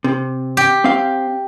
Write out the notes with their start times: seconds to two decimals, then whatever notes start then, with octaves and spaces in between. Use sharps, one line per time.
0.04 C3
0.57 G4
0.84 C4 F5